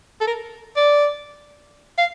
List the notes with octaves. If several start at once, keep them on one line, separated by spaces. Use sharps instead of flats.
A4
A#4
D5
F5